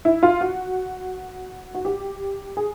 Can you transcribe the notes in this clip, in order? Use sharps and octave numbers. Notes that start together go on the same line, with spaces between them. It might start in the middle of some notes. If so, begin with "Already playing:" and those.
E4
F4
F#4
F#4
G4
G#4